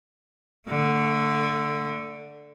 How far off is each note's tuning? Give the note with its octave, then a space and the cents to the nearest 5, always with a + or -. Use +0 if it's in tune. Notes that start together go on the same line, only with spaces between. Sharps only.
D3 +0 A3 +30